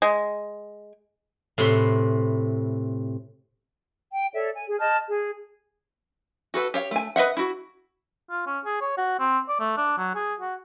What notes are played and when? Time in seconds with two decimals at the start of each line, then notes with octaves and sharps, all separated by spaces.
0.02 G#3
1.58 A2 C3 B4 C6
4.12 G5
4.34 A4 C#5 D5 E5
4.56 G#5
4.68 G#4
4.79 D#5 A5 F6 G6
5.07 G#4
6.54 F#4 A4 B4
6.74 G4 C#5 F5
6.91 A3 G#5
7.16 B4 D#5 E5 F#5
7.37 E4 F#4
8.30 F4
8.47 C#4
8.65 G#4
8.81 C#5
8.98 F#4
9.19 C4
9.48 D5
9.60 A3
9.77 D4
9.98 F#3
10.15 G#4
10.40 F#4